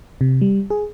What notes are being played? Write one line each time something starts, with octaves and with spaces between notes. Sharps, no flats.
C3
G3
G#4